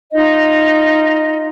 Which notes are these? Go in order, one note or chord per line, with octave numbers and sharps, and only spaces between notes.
D#4 F4 D#5